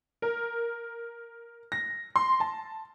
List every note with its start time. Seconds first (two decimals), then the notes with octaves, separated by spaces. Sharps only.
0.22 A#4
1.72 A#6
2.16 C6
2.40 A5